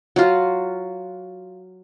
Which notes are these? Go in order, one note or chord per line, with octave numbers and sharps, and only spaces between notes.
F#3 F4